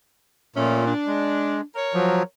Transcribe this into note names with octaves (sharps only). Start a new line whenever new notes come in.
A#2 F3 A3 C#4
D4
G#3
A#4 C#5
F3 F#3